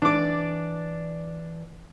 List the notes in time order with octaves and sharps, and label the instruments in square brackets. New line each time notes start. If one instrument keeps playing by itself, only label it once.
[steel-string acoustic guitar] E3 D5 [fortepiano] D4 D6